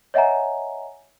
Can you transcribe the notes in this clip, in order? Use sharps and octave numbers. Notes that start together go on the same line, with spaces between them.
C#5 D#5 E5 F#5 G#5 A#5